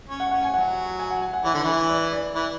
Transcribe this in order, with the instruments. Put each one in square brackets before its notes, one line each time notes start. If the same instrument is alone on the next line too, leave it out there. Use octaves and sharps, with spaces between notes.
[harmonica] C#4
[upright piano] F#5
[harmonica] C#4 [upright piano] F#5
[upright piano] G#5
[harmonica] F#3 [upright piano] F#5
[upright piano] G#5
F#5
G#5
F#5
[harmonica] E3 [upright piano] C#5
[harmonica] D3
E3
[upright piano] D5
D5
[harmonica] E3